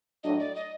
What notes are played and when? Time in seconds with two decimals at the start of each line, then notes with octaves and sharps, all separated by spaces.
0.23 A2 F#3 A3 D4 D#5
0.39 D5
0.55 D#5